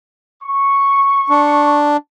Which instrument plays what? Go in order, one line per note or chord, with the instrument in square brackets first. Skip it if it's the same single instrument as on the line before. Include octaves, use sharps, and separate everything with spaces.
[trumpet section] C#6
[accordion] D4